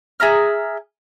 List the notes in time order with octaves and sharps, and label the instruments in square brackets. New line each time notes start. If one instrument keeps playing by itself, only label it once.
[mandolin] G#4 E5 A#5 F6